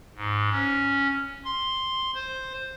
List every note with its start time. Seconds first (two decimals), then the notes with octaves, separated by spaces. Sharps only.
0.16 G#2
0.51 C#4
1.45 C6
2.15 C5